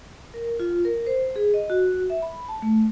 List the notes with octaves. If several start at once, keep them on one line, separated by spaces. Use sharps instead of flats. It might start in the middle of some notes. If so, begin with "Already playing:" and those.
A#4
F4
A#4
C5
G#4
D#5
F#4
E5
B5
A5
A3